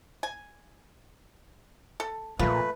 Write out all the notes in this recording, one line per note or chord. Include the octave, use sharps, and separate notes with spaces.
G#5
A4
A#2 F3 A3 A#3 F4 B4